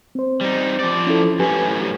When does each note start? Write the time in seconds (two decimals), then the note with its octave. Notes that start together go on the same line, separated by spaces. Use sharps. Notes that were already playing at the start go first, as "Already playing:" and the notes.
0.15 C4 C5
0.41 G3 D#4
0.80 F3 D5
1.07 C#4 E4 A4
1.39 F#2 A2 C#4 G4 B4 G#5